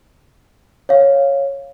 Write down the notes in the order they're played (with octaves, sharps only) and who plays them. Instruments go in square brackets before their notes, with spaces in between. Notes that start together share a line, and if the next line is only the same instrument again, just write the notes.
[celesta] C#5 F5